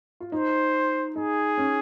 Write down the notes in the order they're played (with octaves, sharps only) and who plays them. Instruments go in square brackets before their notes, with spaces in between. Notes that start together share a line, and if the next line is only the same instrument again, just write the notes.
[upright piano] F4
[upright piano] D#4 [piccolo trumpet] C5
[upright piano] D#4 [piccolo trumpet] G#4
[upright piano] C#4